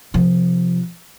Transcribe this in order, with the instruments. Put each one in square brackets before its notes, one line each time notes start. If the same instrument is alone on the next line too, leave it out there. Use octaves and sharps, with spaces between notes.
[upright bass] C3 F3